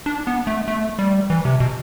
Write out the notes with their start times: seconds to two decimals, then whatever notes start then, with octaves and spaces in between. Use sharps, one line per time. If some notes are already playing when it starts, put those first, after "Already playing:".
0.06 D4
0.27 B3
0.47 A3
0.68 A3
0.99 G3
1.30 E3
1.45 C3
1.60 B2